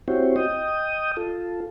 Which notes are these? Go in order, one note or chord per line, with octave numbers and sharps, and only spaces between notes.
C4 E4 F#4 G4 C5 C#5
D#5 G5 D#6
F4 A4